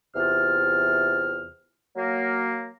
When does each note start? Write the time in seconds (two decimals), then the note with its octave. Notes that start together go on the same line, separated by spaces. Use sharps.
0.14 E2 C3 F4 F6
1.96 F#3 A#3